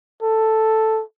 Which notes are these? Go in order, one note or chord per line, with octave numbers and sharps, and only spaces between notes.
A4